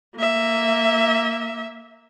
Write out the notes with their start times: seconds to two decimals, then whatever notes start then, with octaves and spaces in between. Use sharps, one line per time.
0.16 A#3 E5